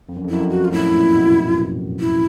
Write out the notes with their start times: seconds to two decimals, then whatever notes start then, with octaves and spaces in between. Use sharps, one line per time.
0.09 F2
0.16 F#2
0.24 F2
0.29 F#2 E4
0.40 F2
0.50 F#4
0.65 F4
0.72 A2 E4
0.94 A#2
1.15 B2
2.00 E4